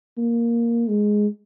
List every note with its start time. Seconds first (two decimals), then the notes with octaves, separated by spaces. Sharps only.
0.18 A#3
0.89 G#3